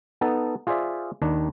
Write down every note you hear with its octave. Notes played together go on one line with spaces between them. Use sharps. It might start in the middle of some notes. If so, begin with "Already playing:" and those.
B3 D#4 A4 A5
F4 G#4 C5 D5 E5
D#2 D#3 D4